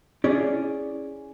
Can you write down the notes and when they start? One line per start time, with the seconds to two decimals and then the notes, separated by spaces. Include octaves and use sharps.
0.24 C#4 E4 G#4 D5